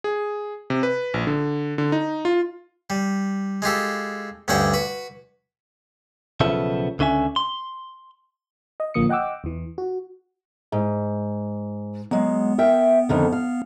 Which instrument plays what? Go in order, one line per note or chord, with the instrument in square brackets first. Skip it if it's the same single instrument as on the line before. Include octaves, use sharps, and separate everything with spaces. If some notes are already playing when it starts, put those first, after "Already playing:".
[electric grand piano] G#4
C3
B4
A#1
D3
D3
D#4
F4
[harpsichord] G3
G#3 F4 G4 A4
D2 G2 C#4 D4 F#5 G5
F#4 B4
[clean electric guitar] B1 C#3 F3 B3 A4 E5
C#2 D3 C#4 E5 G#5
C6
[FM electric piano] D#5
A1 D3 F3 A#3 D#6 C#7
D#5 F#5 G5 D6 E6
E2 E3
F#4
[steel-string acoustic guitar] G#2
[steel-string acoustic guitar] F#3 G#3 [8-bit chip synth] B3
[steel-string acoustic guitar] A#4 E5 G5
F2 D3 D#3
F5